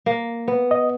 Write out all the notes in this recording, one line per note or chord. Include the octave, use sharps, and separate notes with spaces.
A#3
B3
D#5